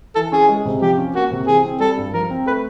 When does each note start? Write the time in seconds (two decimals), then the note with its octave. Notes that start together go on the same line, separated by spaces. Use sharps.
0.15 E3 A4
0.32 C#4 G#4
0.49 G#3
0.65 C3
0.82 F3 G4
0.98 C#4
1.15 A#3 F#4
1.31 C3
1.47 E3 G#4
1.64 C4
1.80 G3 A4
1.97 G2
2.13 F3 A#4
2.30 C4
2.46 A3 B4